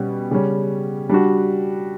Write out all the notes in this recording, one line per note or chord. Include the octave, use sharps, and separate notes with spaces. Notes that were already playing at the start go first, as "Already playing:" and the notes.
Already playing: B2 G3 C#4 G4
C#3 G3 C#4
G3 D4 F#4